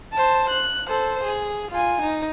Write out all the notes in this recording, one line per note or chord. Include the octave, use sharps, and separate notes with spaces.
C5 A5
F#6
A4 C5
G#4
F4 G#5
D#4